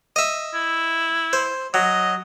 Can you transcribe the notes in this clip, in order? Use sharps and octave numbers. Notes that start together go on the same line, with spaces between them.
D#5 E5
E4
C5
F#3 D#5